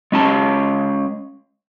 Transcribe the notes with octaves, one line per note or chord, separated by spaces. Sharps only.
G#3 C#4 A5